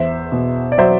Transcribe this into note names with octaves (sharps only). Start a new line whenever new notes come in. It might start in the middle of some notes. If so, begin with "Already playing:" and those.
Already playing: E2 C5 E5
B2
D5
F#3 C5 E5